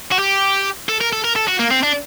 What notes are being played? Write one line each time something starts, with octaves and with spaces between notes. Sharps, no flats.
F#4
G4
A4
A#4
A4
A#4
A4
F#4
A#3
C4
D4